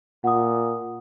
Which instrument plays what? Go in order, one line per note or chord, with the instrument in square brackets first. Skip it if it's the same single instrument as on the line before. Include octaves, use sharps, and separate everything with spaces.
[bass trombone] A#2 [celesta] F#5 D#6